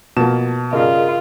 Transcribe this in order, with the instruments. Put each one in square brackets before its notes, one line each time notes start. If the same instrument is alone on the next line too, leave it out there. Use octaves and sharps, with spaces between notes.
[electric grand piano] B2 A5 E7 [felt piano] F3 A#3
[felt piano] G2 C#3 [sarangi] F4 [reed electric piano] G#4 A#4 D#5